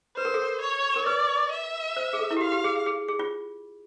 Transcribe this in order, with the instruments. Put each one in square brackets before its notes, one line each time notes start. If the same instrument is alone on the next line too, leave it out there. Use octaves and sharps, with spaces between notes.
[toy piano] B4 [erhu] C5
[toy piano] A#4
A4
A#4
[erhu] C#5
[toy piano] A#4
[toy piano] B4 [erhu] D5
[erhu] E5
[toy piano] C5
G#4
A4
E4
G4
[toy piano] F#4 [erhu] F5
[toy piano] G4
G#4
G#4
G#4
G#4
F4